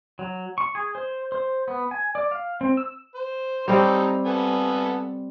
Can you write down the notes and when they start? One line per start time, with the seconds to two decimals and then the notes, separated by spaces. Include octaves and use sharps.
0.19 F#3
0.58 C#6
0.75 G#4
0.95 C5
1.32 C5
1.68 B3
1.91 G#5
2.15 D5
2.31 F5
2.61 C4
2.77 E6
3.15 C5
3.68 G3 C4 D#4 A4 C#5
4.25 B3 A4 G#5